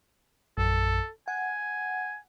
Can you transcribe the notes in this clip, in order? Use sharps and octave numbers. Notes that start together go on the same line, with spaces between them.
A#1 F#2 A4
F#5 G#5